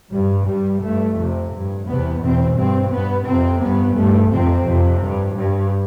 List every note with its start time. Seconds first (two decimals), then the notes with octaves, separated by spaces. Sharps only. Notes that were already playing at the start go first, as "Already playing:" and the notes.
0.11 G2 G3
0.47 G2 G3
0.81 G2 A3
1.17 F2 C3
1.51 G2
1.87 E2 C3 B3
2.21 E2 B2 C4
2.56 G2 C4
2.91 G2 B3
3.26 F2 C3 C4
3.61 G2 B3
3.96 G2 A3
4.31 F2 C3 C4
4.66 F2 C3
5.01 G2
5.36 G2